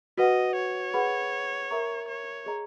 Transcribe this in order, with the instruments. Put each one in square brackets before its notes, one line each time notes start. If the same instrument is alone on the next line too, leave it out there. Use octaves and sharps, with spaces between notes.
[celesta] F#4 B4 F#5 [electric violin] D#5
[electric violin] C#5
[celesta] G#4 B4 F#5 B5
A#4 E5 A#5 C#6
[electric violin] C#5
[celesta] G#4 D#5 A#5